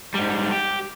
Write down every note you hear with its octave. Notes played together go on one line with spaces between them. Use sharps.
G#2 G3
G4